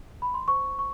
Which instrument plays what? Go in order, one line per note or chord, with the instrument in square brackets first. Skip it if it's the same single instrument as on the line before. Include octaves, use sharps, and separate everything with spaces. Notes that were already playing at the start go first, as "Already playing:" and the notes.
[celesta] B5
C6
C5 C#6
C#6